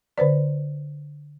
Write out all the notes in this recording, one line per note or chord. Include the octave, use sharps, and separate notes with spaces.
D3 B4 C5 D5